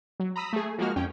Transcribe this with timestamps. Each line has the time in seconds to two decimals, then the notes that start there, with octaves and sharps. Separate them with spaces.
0.20 F#3
0.36 A#5 B5 D#6 E6 B6
0.53 A3 G#4
0.78 F3 G#3 A#3 F#4 F6
0.96 F2 C#4 G5